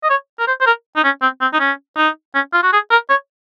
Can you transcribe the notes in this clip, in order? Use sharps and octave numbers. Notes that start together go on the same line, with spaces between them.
D#5
C#5
A#4
C5
C5
A#4
D#4
C#4
C4
C4
D#4
C#4
D#4
C#4
F4
F#4
G#4
A#4
C#5